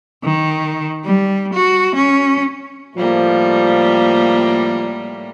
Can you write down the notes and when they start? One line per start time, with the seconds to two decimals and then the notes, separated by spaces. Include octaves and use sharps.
0.24 D#3
1.05 G3
1.54 F#4
1.95 C#4
2.97 A2 F3 G3 A#3